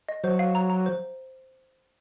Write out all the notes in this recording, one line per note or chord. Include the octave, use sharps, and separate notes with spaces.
D#5
F#3 C5
F5
A#5
A#5
C5